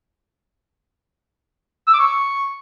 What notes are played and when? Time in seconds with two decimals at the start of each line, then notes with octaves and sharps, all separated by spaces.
1.87 E6
1.93 D6
1.99 C#6